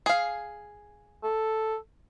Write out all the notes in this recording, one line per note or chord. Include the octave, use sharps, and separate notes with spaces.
G#4 F5
A4